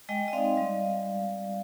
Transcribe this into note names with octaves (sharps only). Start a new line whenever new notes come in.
G#3 D#5 G5
D#5
C4 D#4 D5 F5
G3